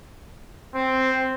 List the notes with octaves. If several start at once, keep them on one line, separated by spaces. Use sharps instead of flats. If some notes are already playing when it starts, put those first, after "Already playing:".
C4